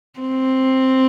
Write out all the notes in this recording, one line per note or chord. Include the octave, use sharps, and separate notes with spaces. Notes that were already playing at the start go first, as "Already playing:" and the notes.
C4